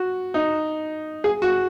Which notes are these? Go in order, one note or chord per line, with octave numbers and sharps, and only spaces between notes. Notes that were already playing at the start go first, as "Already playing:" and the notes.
Already playing: F#4
D#4
G#4
F#4